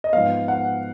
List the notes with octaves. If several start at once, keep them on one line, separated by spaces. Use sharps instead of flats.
D#5
G#2 F3 B3 F5
F#5